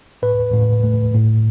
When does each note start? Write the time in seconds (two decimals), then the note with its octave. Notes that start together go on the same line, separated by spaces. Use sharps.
0.22 A2 B4
0.54 A2
0.83 A3
1.14 A2